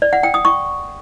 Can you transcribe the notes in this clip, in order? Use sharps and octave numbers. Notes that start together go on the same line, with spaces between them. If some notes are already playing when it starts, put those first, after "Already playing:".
D5
F#5
G5
D#6
C#6